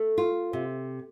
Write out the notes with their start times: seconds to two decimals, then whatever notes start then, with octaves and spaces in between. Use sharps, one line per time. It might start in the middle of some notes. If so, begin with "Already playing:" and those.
Already playing: A3
0.18 F4
0.53 C3